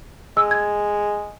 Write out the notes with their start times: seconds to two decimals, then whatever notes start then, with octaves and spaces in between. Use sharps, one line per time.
0.37 G#3 E6
0.51 G#6